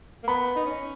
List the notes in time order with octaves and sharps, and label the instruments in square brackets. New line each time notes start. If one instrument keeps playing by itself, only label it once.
[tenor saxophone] A#3
[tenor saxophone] B3 [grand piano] B5
[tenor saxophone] D#4
C#4